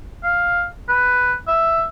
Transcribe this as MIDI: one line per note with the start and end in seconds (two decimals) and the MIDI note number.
0.23 0.65 77
0.88 1.34 71
1.48 1.83 76